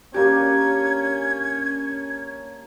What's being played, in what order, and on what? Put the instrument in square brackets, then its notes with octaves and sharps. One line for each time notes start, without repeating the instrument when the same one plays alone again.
[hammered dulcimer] A#3 D4 [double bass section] C#4 [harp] G4 [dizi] G#6